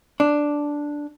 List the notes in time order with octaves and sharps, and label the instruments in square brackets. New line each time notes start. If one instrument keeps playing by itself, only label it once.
[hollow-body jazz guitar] D4